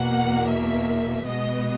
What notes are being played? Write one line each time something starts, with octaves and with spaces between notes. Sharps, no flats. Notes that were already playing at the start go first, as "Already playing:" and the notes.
Already playing: E2 B2 A#3 F#5
E5
B2 G#3 B3 D#5